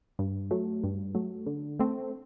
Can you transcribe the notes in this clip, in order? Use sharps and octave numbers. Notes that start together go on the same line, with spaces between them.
G2
F#3 A3
G2
F#3 A3
D3
A3 C4